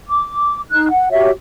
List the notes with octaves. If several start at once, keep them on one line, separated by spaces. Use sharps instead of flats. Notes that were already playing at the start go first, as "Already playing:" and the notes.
D6
D#4 F#6
F#5
F#4 G4 C#5 E5